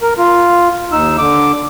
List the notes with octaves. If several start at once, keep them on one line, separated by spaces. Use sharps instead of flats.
A#4
F4
D#2 D#4 E6
D3 D6